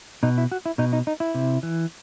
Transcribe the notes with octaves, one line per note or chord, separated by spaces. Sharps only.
B2 D#4
E4
F#4
E4
B2 D#4
D#4
D#4
E4
C3
E3